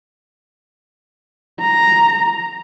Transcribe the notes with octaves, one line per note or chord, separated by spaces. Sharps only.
A#5